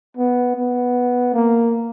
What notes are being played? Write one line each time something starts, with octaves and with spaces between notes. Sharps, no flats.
B3
B3
A#3